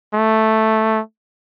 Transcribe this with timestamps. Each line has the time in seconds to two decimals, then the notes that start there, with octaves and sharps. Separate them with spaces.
0.14 A3